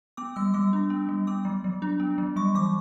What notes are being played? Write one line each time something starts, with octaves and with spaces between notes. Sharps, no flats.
B3 D6
G3 E6
G3 D6
D4
B3
G3
B3 D6
F#3
F#3
D4
B3
F#3
G3 C#6
E3 D6